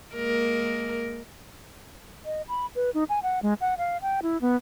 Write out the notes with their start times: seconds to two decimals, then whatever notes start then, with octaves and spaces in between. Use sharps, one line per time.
0.14 G#3 A#3 A#4
2.25 D#5
2.48 B5
2.75 B4
2.94 D#4
3.09 G#5
3.23 F#5
3.43 G#3
3.61 F#5
3.78 F5
4.02 G5
4.23 E4
4.41 B3